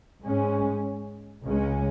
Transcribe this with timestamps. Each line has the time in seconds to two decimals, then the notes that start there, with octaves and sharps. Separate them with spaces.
0.24 G#2 G#3 C#4
1.44 C#2 C#3 G#3 C#4